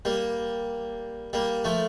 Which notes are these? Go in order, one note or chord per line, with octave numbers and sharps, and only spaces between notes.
G3 A#3
G3 A#3
F3 A3